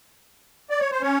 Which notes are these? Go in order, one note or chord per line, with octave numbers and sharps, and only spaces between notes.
D5
C#5
C5
C#4 C#5